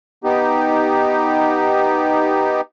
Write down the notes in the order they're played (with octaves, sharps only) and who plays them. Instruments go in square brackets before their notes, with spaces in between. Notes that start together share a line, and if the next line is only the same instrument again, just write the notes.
[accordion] B3 D#4 G4